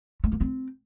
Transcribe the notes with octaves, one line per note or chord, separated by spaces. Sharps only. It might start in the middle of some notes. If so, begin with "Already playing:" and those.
A3
A#3
C4